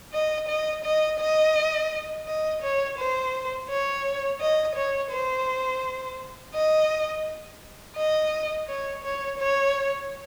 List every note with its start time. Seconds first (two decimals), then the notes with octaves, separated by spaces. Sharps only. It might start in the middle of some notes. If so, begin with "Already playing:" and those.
0.13 D#5
0.48 D#5
0.84 D#5
1.19 D#5
2.26 D#5
2.62 C#5
2.98 C5
3.69 C#5
4.41 D#5
4.75 C#5
5.11 C5
6.54 D#5
7.96 D#5
8.68 C#5
9.03 C#5
9.38 C#5